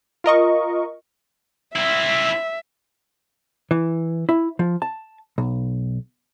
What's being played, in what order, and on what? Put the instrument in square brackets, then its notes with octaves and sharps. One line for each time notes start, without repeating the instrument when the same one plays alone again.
[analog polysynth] F4 A#4 D#5 C#6
[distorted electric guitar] C4 E4 [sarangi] E5
[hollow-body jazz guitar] E3
E4
F3
A5
B1